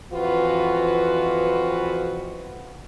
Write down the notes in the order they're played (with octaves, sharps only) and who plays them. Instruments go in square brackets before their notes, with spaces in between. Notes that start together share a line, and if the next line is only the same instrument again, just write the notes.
[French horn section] F2 E3 F3 F4 F#4 B4